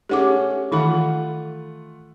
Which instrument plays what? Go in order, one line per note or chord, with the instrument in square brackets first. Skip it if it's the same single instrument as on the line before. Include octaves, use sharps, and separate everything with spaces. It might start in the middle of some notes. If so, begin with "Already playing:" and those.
[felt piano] A3 C#4 G#4 [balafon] G4 F#5 D6
[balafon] D#3 E3 B5 [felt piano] A3 F4 F#5